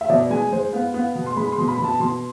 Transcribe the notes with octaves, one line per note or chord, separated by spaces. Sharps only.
E5
B2 D5
G#3 G#5
G#3 C5
B3 F5
B3 F5
B2
C6
G#3 B5
C6
B2
B5
B2
A5
B2 C6